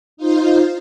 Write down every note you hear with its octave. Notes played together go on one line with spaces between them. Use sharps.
D#4 F4 C5